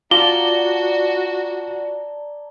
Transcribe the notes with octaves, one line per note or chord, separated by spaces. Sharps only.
F4 F#4 D5 A5 A#5 G7